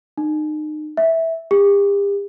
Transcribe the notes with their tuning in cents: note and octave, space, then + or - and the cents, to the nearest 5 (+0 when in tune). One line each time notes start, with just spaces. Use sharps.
D#4 -30
E5 -10
G4 +40